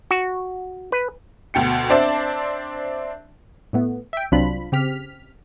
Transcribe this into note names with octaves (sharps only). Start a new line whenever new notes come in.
F#4
B4
D2 B2 G5 C#7
C4 D4 C5 D5 E5 A5
A2 A3 B3
E5 G5
C2 F#3 C4 D4 F4 B5
C#3 C4 G4 F6 B6